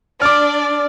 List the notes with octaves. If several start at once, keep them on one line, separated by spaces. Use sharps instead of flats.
D4 D5 D6 F6